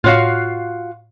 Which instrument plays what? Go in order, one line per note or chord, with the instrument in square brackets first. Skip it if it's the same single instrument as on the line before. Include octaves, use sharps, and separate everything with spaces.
[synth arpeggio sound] A2 C#5 A#6 [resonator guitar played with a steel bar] F4 F#4 F5